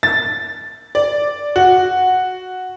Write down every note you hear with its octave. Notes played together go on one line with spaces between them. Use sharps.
A6
D5
F#4